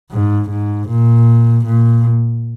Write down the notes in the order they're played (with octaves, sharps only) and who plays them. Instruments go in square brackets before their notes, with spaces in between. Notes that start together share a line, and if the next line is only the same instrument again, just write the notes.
[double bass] G#2
G#2
A#2
A#2